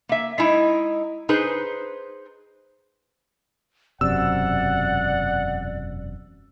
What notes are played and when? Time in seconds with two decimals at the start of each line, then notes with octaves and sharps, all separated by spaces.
0.09 A#3 E5
0.38 G#3 D#4 E4
1.29 D#4 G#4 B4 C5
4.01 E1 F#2 C3 D5 F#5 E6